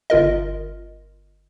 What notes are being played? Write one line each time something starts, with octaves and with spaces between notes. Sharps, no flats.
G1 F4 A#4 D#5